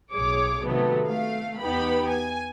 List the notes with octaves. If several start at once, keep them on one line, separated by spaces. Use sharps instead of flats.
B1 G#4 C#5 D6
C3 D#3 F#3 A3 B3
A3 F5
E2 B3 D#4 G4 B5
G#5